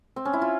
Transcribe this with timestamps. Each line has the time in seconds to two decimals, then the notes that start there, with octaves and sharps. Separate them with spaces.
0.16 C4
0.25 C#4
0.33 E4
0.42 F4